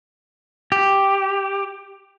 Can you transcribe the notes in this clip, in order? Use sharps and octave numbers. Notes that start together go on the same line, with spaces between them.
G4